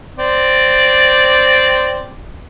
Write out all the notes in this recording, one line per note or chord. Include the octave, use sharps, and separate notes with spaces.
C4 D5